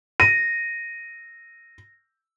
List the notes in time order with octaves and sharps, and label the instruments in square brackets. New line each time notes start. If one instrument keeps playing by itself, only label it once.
[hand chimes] A#6 [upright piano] D#7